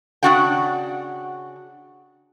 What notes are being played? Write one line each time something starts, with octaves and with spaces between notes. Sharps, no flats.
C#3 G#3 D4 F#4 F#5 G5